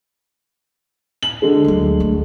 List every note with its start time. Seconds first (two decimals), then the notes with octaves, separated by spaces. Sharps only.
1.23 F#7
1.42 D3 G#3
1.64 D2 F#3
2.00 D2 D#3